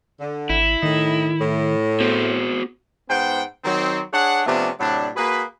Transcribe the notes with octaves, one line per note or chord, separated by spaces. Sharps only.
D3
G#1 E4
A2 D#3 D#4
A2
B3 F#4 G#4 C5
G#2 B3 C5 F#5 G5
D#3 F#3 C4
D4 G#4 C#5 F#5
C3 F3 A3 B3 C#4 D4
A2 C3 F#3 D4
A#3 F#4 G#4 B4